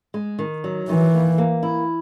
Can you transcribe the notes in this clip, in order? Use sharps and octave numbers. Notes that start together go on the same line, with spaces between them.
G#3
D#3
F#3
D#3 E3
A#3
A#3
E4